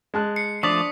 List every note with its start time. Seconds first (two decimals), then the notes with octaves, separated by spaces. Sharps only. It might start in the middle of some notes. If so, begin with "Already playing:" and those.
0.14 G#3 A5 F#6
0.36 C7 C#7
0.63 F3 A3 D4 D5 C#6 D#6 B6